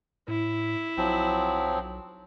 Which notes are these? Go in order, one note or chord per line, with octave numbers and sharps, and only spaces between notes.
A2 E4
B1 F3 F#3 C4